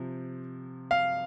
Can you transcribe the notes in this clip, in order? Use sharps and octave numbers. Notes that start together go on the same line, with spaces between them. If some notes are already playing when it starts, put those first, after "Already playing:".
Already playing: C3 F3
F5